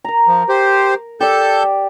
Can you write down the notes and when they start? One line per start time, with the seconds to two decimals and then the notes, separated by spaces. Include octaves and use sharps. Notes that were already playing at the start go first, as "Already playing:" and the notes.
0.04 A#4 A#5
0.28 F3
0.49 G4 C5
1.21 G4 A4 D5 A5 G6